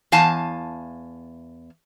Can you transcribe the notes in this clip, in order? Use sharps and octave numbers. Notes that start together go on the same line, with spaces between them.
E2 F5 G#5 A5